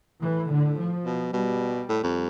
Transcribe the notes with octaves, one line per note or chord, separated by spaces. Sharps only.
A2 E3
D3
F3
B2
B2 G3
A2
F2